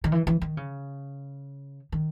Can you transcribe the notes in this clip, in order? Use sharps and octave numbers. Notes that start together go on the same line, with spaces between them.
D#3
E3
E3
D#3
C#3
D#3